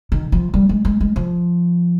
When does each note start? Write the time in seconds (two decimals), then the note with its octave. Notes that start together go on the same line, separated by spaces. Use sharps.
0.12 D#3
0.32 F3
0.54 G3
0.69 G#3
0.85 G#3
1.01 G#3
1.16 F3